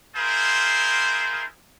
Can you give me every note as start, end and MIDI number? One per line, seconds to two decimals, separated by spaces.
0.16 1.45 64
0.16 1.45 65
0.16 1.45 68
0.16 1.45 70
0.16 1.45 72